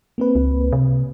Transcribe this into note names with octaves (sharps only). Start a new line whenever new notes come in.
A#3 C4 B4
C#2
C3